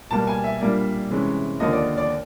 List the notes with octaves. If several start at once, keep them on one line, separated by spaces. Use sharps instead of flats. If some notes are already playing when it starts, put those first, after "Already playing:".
B2 G3 A#3 A5
G#5
E5
A#2 G3 A#3 D4
C3 E3 G#3 C#4
D#2 D3 F3 A#3 D#5
D5
D5